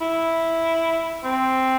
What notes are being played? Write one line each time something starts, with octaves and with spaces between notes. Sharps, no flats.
E4
C4